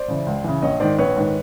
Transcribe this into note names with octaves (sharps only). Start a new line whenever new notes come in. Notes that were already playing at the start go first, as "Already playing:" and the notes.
Already playing: C5 D5
C#3 E3
C#2
C#3 E3
A#1 C#5 D#5
G#2 D#3 C5 D5
A#1 B4 C#5
G#2 D#3